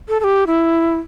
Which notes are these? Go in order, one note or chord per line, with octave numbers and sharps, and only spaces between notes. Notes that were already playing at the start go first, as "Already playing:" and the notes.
A4
A4
G4
E4